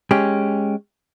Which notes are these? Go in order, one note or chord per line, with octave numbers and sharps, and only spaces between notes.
G#3 C#4 G4